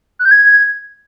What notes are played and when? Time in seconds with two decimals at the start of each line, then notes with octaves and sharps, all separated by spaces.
0.19 F#6
0.25 G6
0.31 G#6